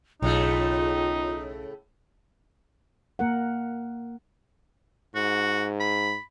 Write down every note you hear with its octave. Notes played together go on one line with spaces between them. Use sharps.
B1 A2 C#3 A3 D#4 F4
A#3 A#4 F#5
G#2 F#4
B5